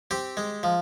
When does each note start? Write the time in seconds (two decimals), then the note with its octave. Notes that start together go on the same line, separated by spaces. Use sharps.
0.11 C4 G4
0.37 G#3
0.63 F3